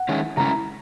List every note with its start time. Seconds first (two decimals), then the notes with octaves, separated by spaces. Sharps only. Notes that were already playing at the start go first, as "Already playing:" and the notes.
Already playing: F#5
0.09 D#3 G#3 C#4 E4
0.37 C#3 G#3 C#4 E4 A#5